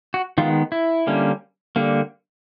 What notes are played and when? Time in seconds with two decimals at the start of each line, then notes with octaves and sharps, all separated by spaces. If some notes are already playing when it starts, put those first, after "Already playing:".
0.14 F#4
0.38 D#3 G#3 B3 F4
0.72 E4
1.07 D3 G3 A#3 C#4
1.76 D3 G3 A#3